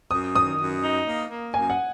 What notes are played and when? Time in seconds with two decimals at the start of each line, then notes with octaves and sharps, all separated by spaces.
0.11 F#2 D#6
0.35 D#3 D#6
0.59 F#2
0.83 D#4
1.06 A#3
1.30 A#3
1.54 F#2 G#5
1.70 F#5